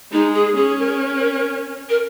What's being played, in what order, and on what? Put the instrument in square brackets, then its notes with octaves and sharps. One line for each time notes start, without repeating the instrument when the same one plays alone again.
[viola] G#3 [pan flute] D#4
[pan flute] G#4
[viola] C#4 [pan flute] G#4
[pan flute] A#4
A#4